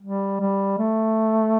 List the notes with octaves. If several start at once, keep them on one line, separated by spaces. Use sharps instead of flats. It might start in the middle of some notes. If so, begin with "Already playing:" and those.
G3
G3
A3